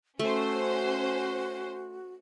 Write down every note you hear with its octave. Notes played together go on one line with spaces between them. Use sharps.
A3 C#4 F#4 C5